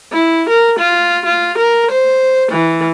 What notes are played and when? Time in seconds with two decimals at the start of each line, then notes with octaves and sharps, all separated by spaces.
0.12 E4
0.49 A#4
0.79 F4
1.26 F4
1.58 A#4
1.91 C5
2.52 E3